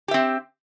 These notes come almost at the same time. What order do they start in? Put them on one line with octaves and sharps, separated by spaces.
G4 E5 C4